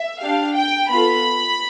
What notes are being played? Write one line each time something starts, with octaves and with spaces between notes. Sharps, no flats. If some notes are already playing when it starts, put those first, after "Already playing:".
Already playing: E5
D4 G4 F5
G5
B3 F4 A4 B5